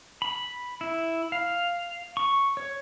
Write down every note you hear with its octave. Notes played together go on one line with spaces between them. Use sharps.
B5
E4
F5
C#6
C#5